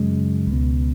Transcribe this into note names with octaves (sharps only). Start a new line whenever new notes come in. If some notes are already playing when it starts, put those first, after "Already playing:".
Already playing: F#2 C#3 G#3
C#2 B2